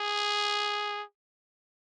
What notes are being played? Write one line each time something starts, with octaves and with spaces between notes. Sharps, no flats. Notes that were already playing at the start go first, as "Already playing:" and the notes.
Already playing: G#4